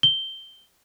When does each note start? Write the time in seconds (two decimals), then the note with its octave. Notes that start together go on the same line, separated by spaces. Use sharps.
0.03 G7